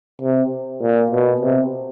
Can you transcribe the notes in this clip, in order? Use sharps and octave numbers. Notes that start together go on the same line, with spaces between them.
C3
A#2
B2
C3